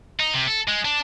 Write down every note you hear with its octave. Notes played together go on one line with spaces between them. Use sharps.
D#4
C3
A4
G#3
D4